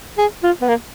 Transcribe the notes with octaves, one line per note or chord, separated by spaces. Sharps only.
G#4
F4
B3
A#3